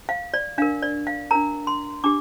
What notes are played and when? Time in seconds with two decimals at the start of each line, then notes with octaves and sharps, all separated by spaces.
0.09 F5
0.34 D5
0.58 D4 A#4 F5
0.82 D5
1.07 F5
1.31 D4 A#4 A#5
1.67 C6
2.04 D4 G4 D6